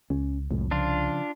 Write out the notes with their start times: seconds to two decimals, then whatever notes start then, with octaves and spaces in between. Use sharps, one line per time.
0.10 C#2 C#4
0.51 C2 F2 A2 G#3
0.71 C#3 F3 D4 F4